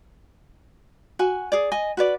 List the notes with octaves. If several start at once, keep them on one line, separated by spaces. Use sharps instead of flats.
F#4 G#5
G#4 D5
D#5 G#5
F#4 B4 D5